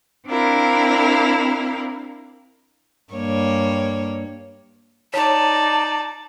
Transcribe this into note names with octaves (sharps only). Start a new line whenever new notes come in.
C4 D4 E4 A#4 F5
G2 A#3 C#5
D#4 C#5 D5 A5